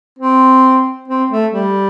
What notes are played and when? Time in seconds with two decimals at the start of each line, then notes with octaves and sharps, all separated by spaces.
0.19 C4
1.08 C4
1.31 A3
1.53 G3